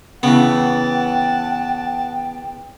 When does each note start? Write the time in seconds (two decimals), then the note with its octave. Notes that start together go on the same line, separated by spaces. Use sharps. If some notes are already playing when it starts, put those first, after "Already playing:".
0.23 C#3 E3 B3 F#5 G5 A5